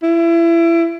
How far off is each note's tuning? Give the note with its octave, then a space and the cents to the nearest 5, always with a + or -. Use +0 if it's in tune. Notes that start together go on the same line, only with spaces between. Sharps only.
E4 +25